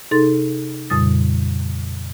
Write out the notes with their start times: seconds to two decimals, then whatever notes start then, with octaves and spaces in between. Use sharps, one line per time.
0.11 C3 D#4 G#4 A4 C6 A6
0.90 F2 A#2 C#3 G3 D#6 A6